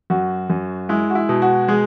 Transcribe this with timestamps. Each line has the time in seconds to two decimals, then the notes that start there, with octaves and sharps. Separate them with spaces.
0.10 F#2 F#4
0.50 F#2
0.89 G#3 E4
1.10 F#4
1.15 E4
1.29 B2
1.42 F#4
1.68 G#3 G#4